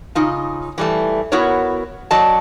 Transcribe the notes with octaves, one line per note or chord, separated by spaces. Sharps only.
C#3 D#4 F4
E3 G3 A3
B3 E4 F#4 A#4 C#5
F#2 F#3 D5 D#5 A5